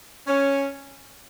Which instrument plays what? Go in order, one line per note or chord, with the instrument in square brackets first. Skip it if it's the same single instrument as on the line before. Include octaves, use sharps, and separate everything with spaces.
[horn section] C#4